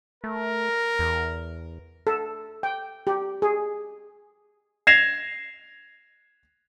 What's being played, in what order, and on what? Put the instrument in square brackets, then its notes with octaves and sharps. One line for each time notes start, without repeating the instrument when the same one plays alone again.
[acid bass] A3 [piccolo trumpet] A#4
[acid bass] E2
[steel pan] A4
G5
G4
G#4
[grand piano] G#6 A#6 C7 E7 F7